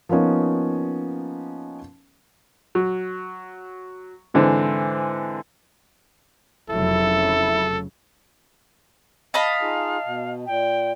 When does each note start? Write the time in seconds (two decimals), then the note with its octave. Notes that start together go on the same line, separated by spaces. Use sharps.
0.09 F3 A#3 B3 C#4 D#4
2.75 F#3
4.34 G#2 D3 E3 C4
6.70 F1 C#3 F#3 E4 A4
9.34 D#5 F5 A5 B5
9.62 D#4 F4 G#4
10.05 B2
10.46 A#2 G5